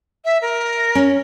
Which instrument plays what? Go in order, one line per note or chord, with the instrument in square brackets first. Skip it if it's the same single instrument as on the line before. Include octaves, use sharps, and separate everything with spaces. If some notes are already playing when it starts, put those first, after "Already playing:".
[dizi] E5
A#4
[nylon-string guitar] C#4